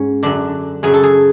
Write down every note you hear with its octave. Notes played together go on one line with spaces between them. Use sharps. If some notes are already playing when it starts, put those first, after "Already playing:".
Already playing: G#2 C#4
F#2 D3 D4
F#2 C#3 G#4
A4
G#4